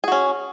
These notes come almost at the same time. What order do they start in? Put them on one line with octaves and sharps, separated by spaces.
G#4 F#4 C#4